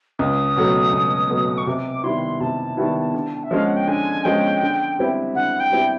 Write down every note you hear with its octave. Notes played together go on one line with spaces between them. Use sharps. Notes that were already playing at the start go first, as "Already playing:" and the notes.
C#2 D#6
B2 F#3 A3
C#2
B2 F#3 A3
C#6
C3 D6
D#3 G3 B3 E4 C6
C3 A5
D#3 G3 B3 E4
D3
E5
F3 G#3 C#4 F5
F#5
G5
D3 G#5
F3 G#3 C#4 G5
D3
G3 C4 E4 G4
D3 F#5
G5
G3 C4 E4 G4